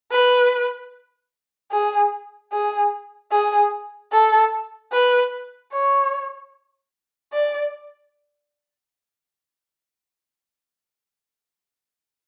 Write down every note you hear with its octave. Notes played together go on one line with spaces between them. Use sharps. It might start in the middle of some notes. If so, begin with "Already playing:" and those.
B4
G#4
G#4
G#4
A4
B4
C#5
D5